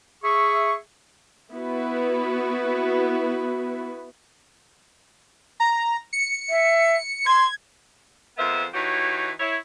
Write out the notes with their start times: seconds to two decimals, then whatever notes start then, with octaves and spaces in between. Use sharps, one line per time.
0.23 G#4 E5 C#6
1.53 B3 E4 F#4 B4
5.60 A#5
6.13 C#7
6.50 E5
7.26 C6 G#6
8.37 F2 G#3 A#3 B3 C5 E5
8.74 E3 D#4 F#4 G4 C#5
9.40 E4 C#5